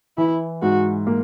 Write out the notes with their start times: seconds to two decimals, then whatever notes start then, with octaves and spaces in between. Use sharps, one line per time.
0.18 E3 E4
0.62 G#2 F#4
1.07 A#3